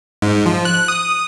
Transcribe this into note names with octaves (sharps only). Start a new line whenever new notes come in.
G#2
F3
F#6
D#6